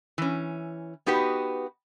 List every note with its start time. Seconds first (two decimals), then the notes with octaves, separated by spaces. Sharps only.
0.18 E3 C#4
1.06 B3 D#4 F#4 G4 B4